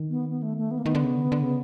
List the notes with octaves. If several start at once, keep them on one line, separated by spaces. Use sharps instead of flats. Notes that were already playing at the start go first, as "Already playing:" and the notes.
Already playing: D#3
B3
B3
A3
A3
B3
A#3
D#3 B3
D3
C#3
D3
D3
C#3